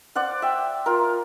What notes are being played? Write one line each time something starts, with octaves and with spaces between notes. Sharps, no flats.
C5 D5 F5 F#5
E5 G5
F4 A#4